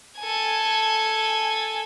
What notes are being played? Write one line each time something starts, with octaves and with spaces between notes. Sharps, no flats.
A4 G#5